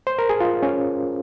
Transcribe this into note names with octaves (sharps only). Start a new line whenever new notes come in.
C5
A#4
G#4
F4
C#4